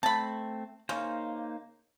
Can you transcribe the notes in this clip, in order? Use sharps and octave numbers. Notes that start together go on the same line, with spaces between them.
A3 C4 A5 B5
C#3 A#3 D#4 C5